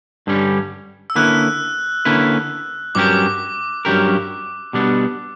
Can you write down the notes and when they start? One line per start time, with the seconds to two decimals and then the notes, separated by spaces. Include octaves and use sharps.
0.27 G2 D3 G3 C#4
1.10 E6
1.15 D3 A#3 C#4 E4 B4 F#6
2.05 D3 A#3 C#4 E4 B4
2.95 G2 F#3 C#4 G4 A#4 D6
3.85 G2 F#3 C#4 G4 A#4
4.73 B2 G3 B3 D4